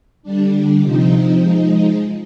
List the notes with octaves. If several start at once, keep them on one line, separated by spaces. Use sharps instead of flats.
D3 G3 D4
C3 F3 C4 D#4
F3 G#3 D#4